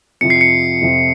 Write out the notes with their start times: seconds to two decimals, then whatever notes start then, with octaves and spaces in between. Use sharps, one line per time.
0.21 F2 C3 F3 C#7
0.30 C7
0.41 C#7
0.81 F2 C3 F3